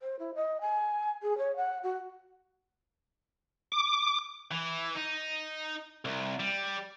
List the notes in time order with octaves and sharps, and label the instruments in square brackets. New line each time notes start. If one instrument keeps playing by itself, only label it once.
[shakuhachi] C5
E4
D#5
G#5
G#4
C#5
F#5
F#4
[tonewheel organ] D6
[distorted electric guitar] E3
D#4
C2
G3